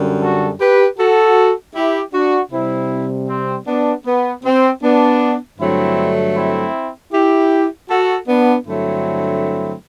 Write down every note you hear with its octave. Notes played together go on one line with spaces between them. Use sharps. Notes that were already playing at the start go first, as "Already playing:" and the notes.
Already playing: F#2 D3 G3
F#4 A4
G4 B4
F#4 A4
E4 G4
D4 F#4
C3 G3 C4 E4
C4
B3 D4
B3
C4
B3 D4
G2 D3 F#3 A3 C4 E4
C4 E4
E4 G4
F#4 A4
B3 D4
G2 D3 F#3 A3 C4 E4